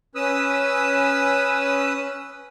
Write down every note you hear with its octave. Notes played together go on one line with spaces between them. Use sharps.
C#4 B4 D#6 E6